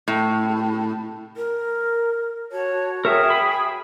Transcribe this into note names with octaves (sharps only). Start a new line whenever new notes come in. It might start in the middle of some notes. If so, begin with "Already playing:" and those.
A2
A#4
F#4 C#5 A5
G#4 A#4 C#5 E5 G5
B5